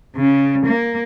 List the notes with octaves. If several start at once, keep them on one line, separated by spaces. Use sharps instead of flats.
C#3
A#3